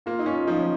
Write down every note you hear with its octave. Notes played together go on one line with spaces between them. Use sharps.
A#3 F4
D#4
C#4
F4
F3 D#4
C#4